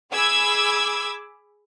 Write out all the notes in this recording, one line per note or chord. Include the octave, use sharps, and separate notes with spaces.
G#4 B5 D6 E6 G#6